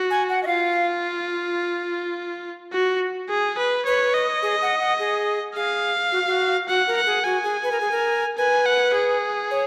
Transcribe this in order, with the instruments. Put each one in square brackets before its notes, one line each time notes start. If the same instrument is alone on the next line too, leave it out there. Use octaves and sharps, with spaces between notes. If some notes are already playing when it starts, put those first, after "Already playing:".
Already playing: [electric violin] F#4
[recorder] G#5
F#5
D#5
[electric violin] F4 [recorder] F5
[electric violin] F#4
G#4
B4
[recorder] B4 [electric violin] C#5
[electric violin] D#5
[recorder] G#4
F#5
F#5
G#4
[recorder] G#4 [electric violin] F5
[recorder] F#4
F#4
[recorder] F#4 [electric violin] F#5
[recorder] A#4
[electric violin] F#5
[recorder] G#4
[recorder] F#4 [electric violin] G#5
[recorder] G#4
B4
A#4
G#4
A#4
[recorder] B4 [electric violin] G#5
[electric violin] F#5
G#4
[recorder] C#5